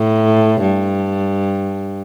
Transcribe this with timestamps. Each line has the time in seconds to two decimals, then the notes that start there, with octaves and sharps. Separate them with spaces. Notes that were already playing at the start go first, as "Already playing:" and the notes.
Already playing: A2
0.61 G2